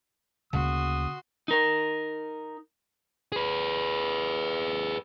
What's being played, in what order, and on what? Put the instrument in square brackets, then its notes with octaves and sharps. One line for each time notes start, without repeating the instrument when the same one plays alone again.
[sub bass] D2 [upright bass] C#3 A#3 [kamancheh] F#4 C6 [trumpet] D#6
[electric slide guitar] D#4 A#4
[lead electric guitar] G#4 B4